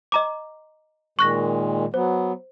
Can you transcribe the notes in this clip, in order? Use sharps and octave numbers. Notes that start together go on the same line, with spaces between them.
D#5 A#5 D6
A#2 D#3 G#3 C#6 F#6 A#6
F#3 B3 C5